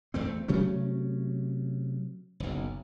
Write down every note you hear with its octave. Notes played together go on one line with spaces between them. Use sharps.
E2 A3 C4
C3 F#3 A3 C#4
F#1 B1